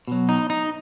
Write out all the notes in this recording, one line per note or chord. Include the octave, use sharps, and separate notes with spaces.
B2 F#3
D#4
D#4